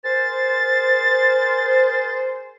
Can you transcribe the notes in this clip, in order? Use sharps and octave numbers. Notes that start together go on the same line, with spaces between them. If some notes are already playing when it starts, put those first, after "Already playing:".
G#4 A#4 C5 A6